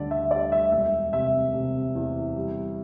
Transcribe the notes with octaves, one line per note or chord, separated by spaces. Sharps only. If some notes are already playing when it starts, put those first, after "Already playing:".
Already playing: D2 D3 G3 D5
E5
G3 D5
E5
E1 E5
C3 E5
C3
E2
G3